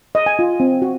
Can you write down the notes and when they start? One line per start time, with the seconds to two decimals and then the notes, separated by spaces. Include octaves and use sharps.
0.15 D#5
0.26 G#5
0.39 F4
0.60 C4
0.82 F#4